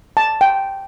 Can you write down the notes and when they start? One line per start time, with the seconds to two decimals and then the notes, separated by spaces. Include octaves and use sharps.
0.17 A5
0.41 G5